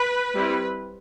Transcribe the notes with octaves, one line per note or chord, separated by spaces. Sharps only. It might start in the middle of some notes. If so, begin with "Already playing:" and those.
Already playing: B4
G3 C4 E4